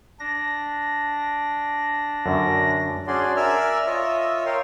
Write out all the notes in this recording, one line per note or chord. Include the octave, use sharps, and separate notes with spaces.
D4 A#6
F#2 D3 C#4
C#4 D4 F#4 G#4 D5 C6
A#4 D5 E5 G#5 E6 F6
F4 C#5 D#5 E5 E6
A#4 C#5 F5 G5 C6